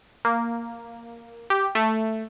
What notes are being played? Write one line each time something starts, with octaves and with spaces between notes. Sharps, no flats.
A#3
G4
A3